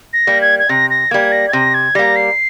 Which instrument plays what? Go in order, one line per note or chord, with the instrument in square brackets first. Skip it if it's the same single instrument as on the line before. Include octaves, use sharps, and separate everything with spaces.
[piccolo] A#6
[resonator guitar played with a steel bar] G3 A#3
[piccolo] G#6
G#6
[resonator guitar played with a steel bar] C3 [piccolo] A#6
[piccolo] A#6
[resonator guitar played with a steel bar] G3 A#3 [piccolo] G#6
[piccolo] A#6
G#6
[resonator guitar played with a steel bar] C3 [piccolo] A#6
[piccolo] G#6
[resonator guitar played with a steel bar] G3 A#3 [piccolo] A#6
[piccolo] C7